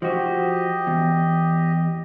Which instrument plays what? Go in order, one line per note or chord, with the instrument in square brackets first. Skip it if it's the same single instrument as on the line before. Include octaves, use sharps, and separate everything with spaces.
[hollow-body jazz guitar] F3 F#4 [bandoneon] G4 D#5
[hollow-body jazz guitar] E2